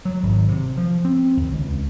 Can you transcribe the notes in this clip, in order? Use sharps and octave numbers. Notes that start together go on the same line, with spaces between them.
F#3
G#1
C3
F3
C4
D#2
C#2